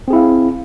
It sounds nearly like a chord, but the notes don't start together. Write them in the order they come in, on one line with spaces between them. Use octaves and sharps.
C4 G#4 E4 F5